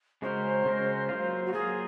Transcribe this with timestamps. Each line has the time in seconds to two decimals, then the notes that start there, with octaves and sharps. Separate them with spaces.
0.22 C#3 G#3 C#4 F#4 A#4 C5
0.65 C#3 G#3 C#4 F#4 A#4
1.09 F#3 A#3 F4
1.46 F#4
1.53 F#3 A#3 F4 G#4